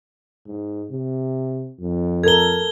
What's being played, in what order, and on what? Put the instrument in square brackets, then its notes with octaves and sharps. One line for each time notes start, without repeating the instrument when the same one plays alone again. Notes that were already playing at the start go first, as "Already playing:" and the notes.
[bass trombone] G#2
C3
F2
[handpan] A4 A#4 [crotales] G#6 G7